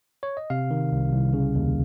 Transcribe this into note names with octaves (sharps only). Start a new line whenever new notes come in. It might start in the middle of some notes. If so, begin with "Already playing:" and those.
C#5
D#5
C3 F5
D#3
C2
C2
C#3
D#2